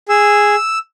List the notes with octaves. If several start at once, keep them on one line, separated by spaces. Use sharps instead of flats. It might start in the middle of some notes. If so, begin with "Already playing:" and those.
G#4 E6